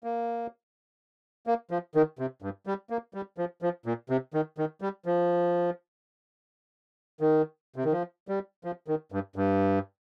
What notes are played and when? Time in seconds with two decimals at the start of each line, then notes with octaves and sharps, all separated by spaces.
0.04 A#3
1.47 A#3
1.71 F3
1.95 D#3
2.19 C3
2.42 G2
2.67 G3
2.90 A#3
3.14 G3
3.38 F3
3.62 F3
3.86 A#2
4.10 C3
4.34 D#3
4.58 D#3
4.81 G3
5.06 F3
7.21 D#3
7.76 C3
7.85 D#3
7.92 F3
8.28 G3
8.64 F3
8.88 D#3
9.12 G2
9.36 G2